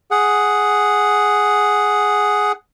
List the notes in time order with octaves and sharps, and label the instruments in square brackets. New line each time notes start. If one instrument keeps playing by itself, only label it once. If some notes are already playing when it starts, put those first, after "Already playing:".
[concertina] G#4 F#5